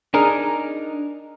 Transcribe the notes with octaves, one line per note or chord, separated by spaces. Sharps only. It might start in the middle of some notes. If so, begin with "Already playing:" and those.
D4 D#4 G#4 A#4